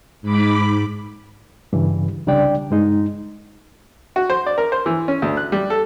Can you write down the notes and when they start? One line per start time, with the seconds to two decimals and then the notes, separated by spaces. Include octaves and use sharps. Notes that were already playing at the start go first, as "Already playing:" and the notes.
0.22 G#2 B5 D6
1.73 G2 C#3 E3
2.27 C2 C#3 G3 D4 D5 G5
2.71 G2 G#3 D#4
4.16 F#4
4.30 C5
4.46 D5
4.58 A#4
4.72 C5
4.86 E3
5.08 C#4
5.22 D2
5.37 F#6
5.52 G3
5.70 A4